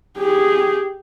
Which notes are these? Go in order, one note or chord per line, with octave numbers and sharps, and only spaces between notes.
G4 G#4